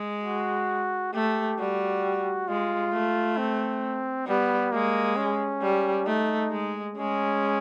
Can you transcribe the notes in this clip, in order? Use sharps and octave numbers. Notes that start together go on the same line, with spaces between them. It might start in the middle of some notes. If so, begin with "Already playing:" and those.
Already playing: G#3
F#4
A3 G4
G3 F#4
G#3 F4
A3
C4
G3 B3
G#3 A#3
C#4
G3
A3 D#4
G#3
G#3 C#4